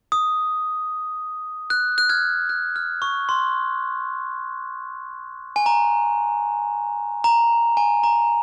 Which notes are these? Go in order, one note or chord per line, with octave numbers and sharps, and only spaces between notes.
D#6
F#6
F#6
F6 G#6
F#6
F6
C#6
C6
G#5
A#5
A#5
G#5
A#5